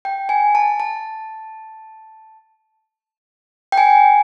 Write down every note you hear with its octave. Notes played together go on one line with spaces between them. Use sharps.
G5
G#5
A5
A5
G5
G#5